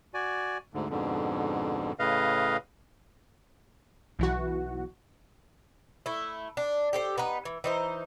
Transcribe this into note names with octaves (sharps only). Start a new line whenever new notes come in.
F#4 D5 G#5
D2 G#2 D3
F2 G#2 B2 D3
A2 C#3 B4 D#5 F5
B1 E3 F#4
A3 E4
D4
G4 A4 C5
B3 D#4 B4
E3
E3 D#4 C5